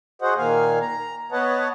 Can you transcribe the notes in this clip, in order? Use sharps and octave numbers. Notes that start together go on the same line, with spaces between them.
F#4 G#4 C5 D#5 F#5
A#2 D#3 A#3 F5 G#5
A#5
B3 B4 C#5 D#5 F#5 A5